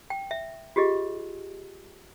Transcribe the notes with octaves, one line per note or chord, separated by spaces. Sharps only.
G5
E5
F4 G4 G#4 D#5